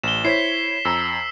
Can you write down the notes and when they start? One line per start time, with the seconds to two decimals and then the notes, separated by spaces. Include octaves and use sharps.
0.03 A1 E7 G7
0.25 E4 C5 C#5 B6 C7
0.85 F2 A#5 E6